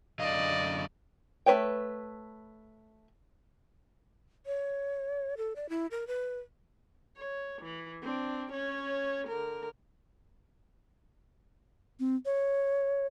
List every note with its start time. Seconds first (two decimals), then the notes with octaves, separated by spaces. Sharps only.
0.20 F#2 D3 D5 D#5 F5
1.46 A3 D#4 B4 C#5 G5
4.46 C#5
5.37 A4
5.56 D5
5.69 E4
5.91 A#4
6.07 B4
7.17 C#5
7.62 E3
8.02 C4 D4
8.52 C#4 C#5
9.27 D3 A#4
12.00 C4
12.25 C#5